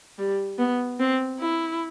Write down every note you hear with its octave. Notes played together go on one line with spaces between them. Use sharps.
G3
B3
C4
E4